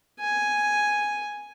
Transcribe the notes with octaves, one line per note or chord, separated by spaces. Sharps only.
G#5